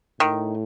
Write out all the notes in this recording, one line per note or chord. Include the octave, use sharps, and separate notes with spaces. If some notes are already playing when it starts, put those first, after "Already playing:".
A2 D#3